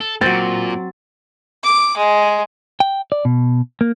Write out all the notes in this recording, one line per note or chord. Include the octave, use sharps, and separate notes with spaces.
A4
A#2 F#3 C4 A6
D6
G#3
G5
D5
B2
A#3